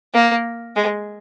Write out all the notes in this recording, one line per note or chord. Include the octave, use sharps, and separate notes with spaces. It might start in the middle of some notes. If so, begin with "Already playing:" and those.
A#3
G#3